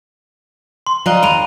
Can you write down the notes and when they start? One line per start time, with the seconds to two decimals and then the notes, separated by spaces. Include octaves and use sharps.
0.87 C6
1.06 G3 D#5 F5 A#5 F#6
1.23 D#2 B5 D7 D#7 F7